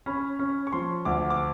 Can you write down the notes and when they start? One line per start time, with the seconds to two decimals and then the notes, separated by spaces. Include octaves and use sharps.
0.06 C#4 B5
0.39 C#4
0.67 C#6
0.72 F3 C6
1.05 D2 D6
1.30 D6